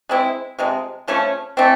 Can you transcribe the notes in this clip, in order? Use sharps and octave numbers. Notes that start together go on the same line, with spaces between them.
G#3 C4 E4
C3 F3 G#3
C#3 F3 A3 C#4
E3 A3 C4